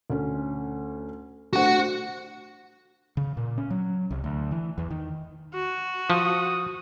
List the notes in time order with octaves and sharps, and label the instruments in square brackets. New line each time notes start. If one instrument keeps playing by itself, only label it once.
[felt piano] D2 C#4
[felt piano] A3 D4 C5 [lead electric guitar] F#4 F#5
[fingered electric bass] C#3
A#2
C#4
F#3
C2
D2
E3
E2
D#3
[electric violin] F#4
[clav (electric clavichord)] F3 [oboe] D#6